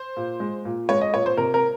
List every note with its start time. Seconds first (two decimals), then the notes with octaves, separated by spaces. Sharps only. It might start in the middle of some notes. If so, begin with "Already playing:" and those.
Already playing: C5
0.17 A#2
0.40 G#3
0.65 A#2
0.89 G#3 C#5
1.01 D#5
1.14 A#2 C#5
1.26 C5
1.37 C3 A#4
1.54 A#4